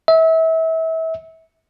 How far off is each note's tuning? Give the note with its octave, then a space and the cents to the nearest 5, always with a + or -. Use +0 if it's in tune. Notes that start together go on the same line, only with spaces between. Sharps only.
E5 -30